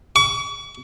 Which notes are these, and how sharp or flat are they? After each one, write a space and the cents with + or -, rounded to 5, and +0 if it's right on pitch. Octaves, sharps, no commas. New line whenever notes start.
C#6 +40